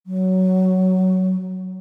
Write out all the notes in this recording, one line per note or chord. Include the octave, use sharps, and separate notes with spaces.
F#3